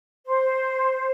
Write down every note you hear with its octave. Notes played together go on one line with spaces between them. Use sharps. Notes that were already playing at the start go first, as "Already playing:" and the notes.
C5